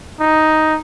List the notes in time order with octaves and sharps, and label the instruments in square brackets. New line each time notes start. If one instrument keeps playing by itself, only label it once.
[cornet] D#4